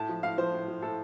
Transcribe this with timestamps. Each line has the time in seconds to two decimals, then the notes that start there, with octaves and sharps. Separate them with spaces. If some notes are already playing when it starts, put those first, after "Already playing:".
Already playing: A2 A5
0.09 F3
0.23 A2 F5
0.38 F3 C5
0.53 A2
0.68 F3
0.82 A2 A4